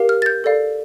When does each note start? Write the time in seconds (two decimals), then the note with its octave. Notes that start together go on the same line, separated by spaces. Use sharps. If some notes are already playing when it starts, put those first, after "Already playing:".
Already playing: G4 A#4 F5
0.09 F6
0.22 A6
0.26 G6
0.44 A4 D5 F5